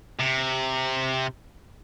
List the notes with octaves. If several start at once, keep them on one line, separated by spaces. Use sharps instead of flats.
C3